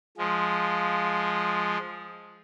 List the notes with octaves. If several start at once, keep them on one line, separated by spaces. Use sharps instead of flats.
F3 G#3